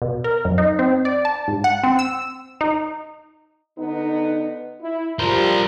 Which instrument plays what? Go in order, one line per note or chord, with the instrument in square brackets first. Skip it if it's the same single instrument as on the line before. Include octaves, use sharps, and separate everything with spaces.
[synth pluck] B2
A#4
F#2
D#4
C4
D5
A5
G#2
F#5
C4
E6
D#4
[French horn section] D3 B3 D#4
E4
[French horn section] F3 G3 [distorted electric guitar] A#4 C5